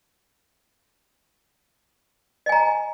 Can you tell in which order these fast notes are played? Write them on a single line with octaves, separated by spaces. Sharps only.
D#5 G#5 A#5